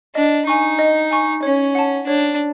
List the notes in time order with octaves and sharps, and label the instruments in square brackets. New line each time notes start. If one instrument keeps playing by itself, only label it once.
[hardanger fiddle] D4 [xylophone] D#5
[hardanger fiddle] D#4 [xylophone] G#5 C#6
[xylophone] D#5
G#5 C#6
[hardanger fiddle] C#4 [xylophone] C#5
[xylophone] F#5 A5
[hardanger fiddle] D4 [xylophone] C#5